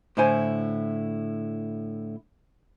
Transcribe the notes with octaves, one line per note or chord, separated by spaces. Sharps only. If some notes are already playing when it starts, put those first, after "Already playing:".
A2 D3 E4 C5 G#5